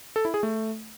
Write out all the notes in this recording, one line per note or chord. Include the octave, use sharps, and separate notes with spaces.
A4
E4
G#4
A3